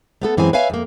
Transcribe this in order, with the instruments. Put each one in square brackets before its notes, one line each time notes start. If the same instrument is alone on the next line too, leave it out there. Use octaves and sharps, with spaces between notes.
[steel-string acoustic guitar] A3 B3 A4
F#2 E3 G#3 C4 G#5
B4 C#5 E5 F5 G#5
F2 A#3